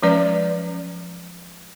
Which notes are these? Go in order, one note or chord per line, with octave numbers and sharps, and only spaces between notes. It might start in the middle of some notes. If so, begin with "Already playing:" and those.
F3 F#3 G#3 C#4 B4 D5